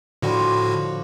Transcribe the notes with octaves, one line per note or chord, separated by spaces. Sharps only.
A2 D3 F3 G3 D4 F#4